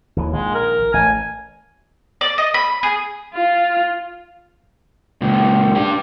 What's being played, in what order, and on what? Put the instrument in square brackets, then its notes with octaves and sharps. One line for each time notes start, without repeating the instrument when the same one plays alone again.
[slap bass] D#2 E3
[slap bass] A#1 D#3 [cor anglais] G#3
[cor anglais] A#4
[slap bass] A1 [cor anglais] G#5
[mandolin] D5
D#5
B5
G#4
[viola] F4
[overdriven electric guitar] C#2 A#2
D4 G4